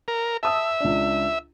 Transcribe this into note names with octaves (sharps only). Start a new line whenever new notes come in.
A#4
E5 A5 D#6 E6
C#2 D4